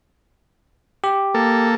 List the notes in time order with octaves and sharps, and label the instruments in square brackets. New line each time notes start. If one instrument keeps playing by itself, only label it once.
[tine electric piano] G4
[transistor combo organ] A#3 A4